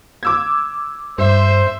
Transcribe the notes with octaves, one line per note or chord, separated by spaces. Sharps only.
D6 E6 G#6
G2 C5 E5